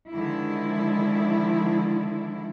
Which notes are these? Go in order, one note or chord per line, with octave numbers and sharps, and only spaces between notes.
D3 D#3 F3 G#3 E4